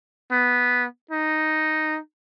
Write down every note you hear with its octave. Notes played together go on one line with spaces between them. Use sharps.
B3
D#4